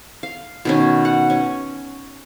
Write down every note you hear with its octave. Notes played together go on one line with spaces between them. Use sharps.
F5
B2 D#3 C#4
F#5
C#4